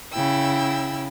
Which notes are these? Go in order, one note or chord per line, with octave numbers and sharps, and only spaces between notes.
C#3 E4 G5 E6